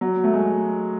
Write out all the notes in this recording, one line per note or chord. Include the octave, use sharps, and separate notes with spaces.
F#3
A3
G#3